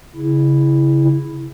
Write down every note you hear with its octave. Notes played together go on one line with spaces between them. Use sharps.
C#3 E4